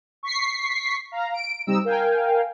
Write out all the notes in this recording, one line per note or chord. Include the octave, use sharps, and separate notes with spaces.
C#6 B6 C7
F5 A#5
D7
C3 G3 C4 D#4 D#5 E6
A#4 F5 G5 G#5